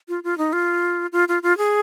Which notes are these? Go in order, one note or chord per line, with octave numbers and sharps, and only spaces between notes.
F4
F4
D#4
F4
F4
F4
F4
G#4